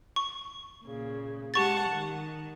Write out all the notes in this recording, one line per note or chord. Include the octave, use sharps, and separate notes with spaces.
C#6
A#2 C#3
G#3 G4 F#5 A5 C#6 A6
D#3